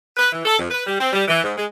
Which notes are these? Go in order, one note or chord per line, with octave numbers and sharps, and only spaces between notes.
B4
E3
A4
F2
B4
G3
C4
G3
E3
G#2
G#3